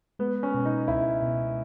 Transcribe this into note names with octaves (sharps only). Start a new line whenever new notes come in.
G#3 B3
C#4
B2
D#4
C#2 E4
B2